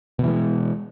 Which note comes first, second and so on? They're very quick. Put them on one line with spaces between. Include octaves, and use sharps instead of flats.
B2 E3 G#3